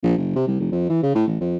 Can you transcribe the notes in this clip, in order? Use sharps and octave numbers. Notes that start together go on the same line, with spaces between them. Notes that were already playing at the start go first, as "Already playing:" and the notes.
A#1
F#1
C3
C2
F1
F2
E3
C#3
A2
A1
F2